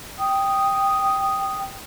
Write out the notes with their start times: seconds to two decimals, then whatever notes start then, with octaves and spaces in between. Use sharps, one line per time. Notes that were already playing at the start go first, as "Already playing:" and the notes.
0.19 G5 D#6